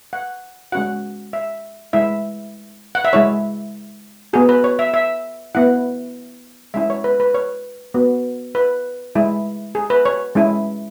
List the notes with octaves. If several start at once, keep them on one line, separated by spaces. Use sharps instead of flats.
F#5
G#3 C#4 F#4 F#5
E5
G#3 E4 E5
F#5
E5
G#3 E4 C#5
B3 F#4 G#4
B4
C#5
E5
E5
B3 E4 F#5
G#3 C#4 E4 E5
C#5
B4
B4
C#5
B3 F#4
B4
G#3 E4
G#4
B4
C#5
G#3 C#4 E4